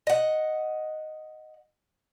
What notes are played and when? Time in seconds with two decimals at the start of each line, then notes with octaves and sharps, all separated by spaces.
0.07 D#5 F#5